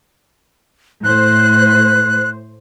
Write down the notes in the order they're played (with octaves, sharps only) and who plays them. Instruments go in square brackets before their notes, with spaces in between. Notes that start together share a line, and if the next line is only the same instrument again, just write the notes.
[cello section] A2 C5 [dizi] F#6